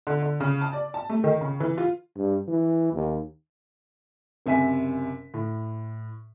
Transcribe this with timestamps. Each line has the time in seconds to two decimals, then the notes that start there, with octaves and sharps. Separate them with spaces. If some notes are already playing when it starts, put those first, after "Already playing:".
0.07 D3
0.22 D3
0.40 C#3
0.61 A5
0.73 D5
0.94 A5
1.09 A3
1.24 D#3
1.41 C#3
1.60 E3
1.78 F4
2.16 G2
2.48 E3
2.93 D#2
4.46 F#1 C3 E5 G#5 B6
5.34 A2